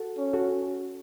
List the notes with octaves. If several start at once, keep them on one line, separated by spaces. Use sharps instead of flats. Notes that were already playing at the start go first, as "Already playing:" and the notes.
Already playing: F#4 A4
C#4
F#4 A4